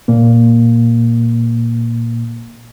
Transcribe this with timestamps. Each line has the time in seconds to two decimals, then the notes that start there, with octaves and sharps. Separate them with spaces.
0.08 A#2 A#3